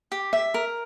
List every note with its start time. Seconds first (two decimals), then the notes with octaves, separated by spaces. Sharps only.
0.12 G4
0.33 E5
0.54 A#4